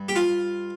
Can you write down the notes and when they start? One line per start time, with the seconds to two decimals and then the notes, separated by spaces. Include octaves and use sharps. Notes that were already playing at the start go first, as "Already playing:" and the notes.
Already playing: G2
0.09 G4
0.16 F4